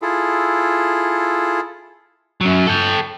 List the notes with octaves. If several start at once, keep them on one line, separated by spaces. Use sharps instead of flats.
E4 F4 G#4 A4
F#2 F#3
A4 G5